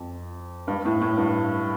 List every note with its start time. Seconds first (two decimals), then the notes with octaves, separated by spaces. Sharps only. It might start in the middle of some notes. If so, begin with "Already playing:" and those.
Already playing: F2
0.68 G2
0.85 A2
1.01 A2
1.17 G2